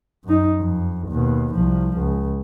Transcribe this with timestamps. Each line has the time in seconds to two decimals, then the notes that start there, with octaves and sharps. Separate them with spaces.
0.24 F#2 D#4
0.61 F2
1.09 D#2 B2
1.54 C2 F3
1.98 C#2